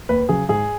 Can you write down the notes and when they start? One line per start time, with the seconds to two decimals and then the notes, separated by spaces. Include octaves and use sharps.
0.09 D#2 B4
0.29 C#3 F#3 G#4
0.49 G#2 G#4